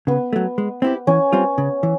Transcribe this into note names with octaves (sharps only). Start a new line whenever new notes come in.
C#3 B3
F#3 A3
G#3
C4 E4 G4
E3 C#4
G3 C4 F4
C#3
E3